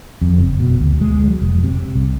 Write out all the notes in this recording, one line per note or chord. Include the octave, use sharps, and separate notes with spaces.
F2
F#1
B2
D2
G#3
F#3
F1
C3
C2